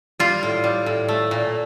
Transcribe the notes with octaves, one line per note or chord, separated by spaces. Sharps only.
G3 F4
A2
G3
A2
A3
A#2